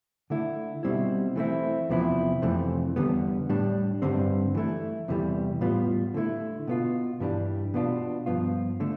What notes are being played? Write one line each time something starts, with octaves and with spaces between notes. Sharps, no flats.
D3 A3 E4
B2 G3 C4 E4
E3 A3 C4 E4
E2 C3 F3 B3 E4
F2 C3 E3 A3
E2 D3 G3 B3
A2 G3 D4
G2 D3 G3 C4
E3 A3 E4
E2 C3 E3 G3
A2 G3 B3 F4
D3 A3 E4
B2 B3 F4
G2 E3 G3 D4
B2 B3 D4 F4
G2 F3 B3 F4
D3 A3